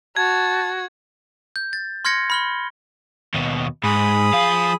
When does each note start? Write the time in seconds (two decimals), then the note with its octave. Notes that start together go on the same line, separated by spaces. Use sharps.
0.16 F#4 A5 G#6
1.56 G6
1.73 A6
2.05 C6 F6 G#6 A#6 C#7
2.30 B5 F6 G7
3.34 D#2 B2
3.84 G#2 G#4 B5 D#6
4.33 F3 F5